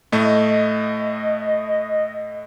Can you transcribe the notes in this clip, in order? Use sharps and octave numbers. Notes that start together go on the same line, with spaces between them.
A2 A3 D#5